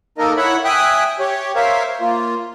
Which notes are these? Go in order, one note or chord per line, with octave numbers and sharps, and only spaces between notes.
A#3 D#4 A4 A#4 D#5
E4 C#5 E5 F#5 B5
E5 G5 G#5 D#6 F#6
G4 C#5
A#4 C5 C#5 E5 F5
A#3 F4